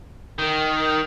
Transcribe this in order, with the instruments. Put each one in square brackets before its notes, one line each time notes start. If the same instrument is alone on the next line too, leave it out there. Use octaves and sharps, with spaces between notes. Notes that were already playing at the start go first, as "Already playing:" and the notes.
[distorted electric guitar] D#3